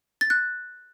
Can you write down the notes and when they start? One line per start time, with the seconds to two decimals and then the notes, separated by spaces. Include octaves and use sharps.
0.21 A6
0.30 F#6